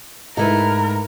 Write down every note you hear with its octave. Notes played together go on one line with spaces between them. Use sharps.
G#2 A3 E4 A#4 B4